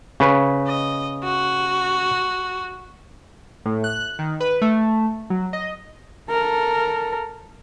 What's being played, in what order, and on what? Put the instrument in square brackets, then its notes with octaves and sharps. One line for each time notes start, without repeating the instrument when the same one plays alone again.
[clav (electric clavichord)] C#3 B4
[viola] D#5
F#4
[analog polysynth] A2
F#6
D#3
B4
A3
F#3
D#5
[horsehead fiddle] A4 A#4